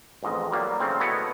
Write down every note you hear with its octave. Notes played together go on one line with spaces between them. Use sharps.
A1 F2 G#2 D#5
F#3 G3 A#3
C#3 A3 C4
A3 B3 E4 F#4 C#5 D#5